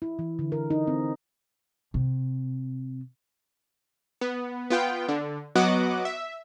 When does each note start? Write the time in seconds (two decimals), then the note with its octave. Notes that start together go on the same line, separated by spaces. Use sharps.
0.02 E4
0.19 E3
0.39 D3
0.52 A#4
0.70 D#4
0.87 C4
1.94 C3
4.21 B3
4.70 B3 F4 G5
5.09 D3
5.56 F#3 B3 F#4 D#5 F#5 D6
6.05 E5